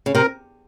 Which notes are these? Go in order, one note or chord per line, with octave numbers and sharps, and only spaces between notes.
C#3
C3 A#4